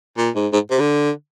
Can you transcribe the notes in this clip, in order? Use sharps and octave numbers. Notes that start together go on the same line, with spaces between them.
A#2
G#2
G#2
C3
D3